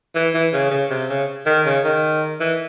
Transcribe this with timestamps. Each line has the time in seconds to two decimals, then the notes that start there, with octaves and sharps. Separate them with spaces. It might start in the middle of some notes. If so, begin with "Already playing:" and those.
0.15 E3
0.34 E3
0.53 C#3
0.71 C#3
0.90 C3
1.10 C#3
1.46 D#3
1.66 C#3
1.84 D#3
2.40 E3